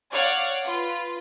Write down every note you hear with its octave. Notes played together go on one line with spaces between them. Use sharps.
C#5 D5 F5 F#5 F6 G#6
F4 B4